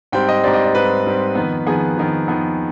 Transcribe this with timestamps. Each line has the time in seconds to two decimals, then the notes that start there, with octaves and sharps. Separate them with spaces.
0.12 G#2 G3 C4 G5
0.28 D#5
0.43 G#2 G3 C4 D5
0.54 D#5
0.64 D5
0.75 G#2 G3 C4 B4
1.05 G#2 G3 C4
1.35 F2 D#3 B3
1.66 F2 D#3 B3 G#4
1.97 F2 D#3 B3
2.28 F2 D#3 B3